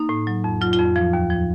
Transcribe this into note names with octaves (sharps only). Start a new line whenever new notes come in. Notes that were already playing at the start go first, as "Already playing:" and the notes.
Already playing: A#3 D#4
A2
F#3
F2
F#3 F4
F4
F2
F3
D#2
F3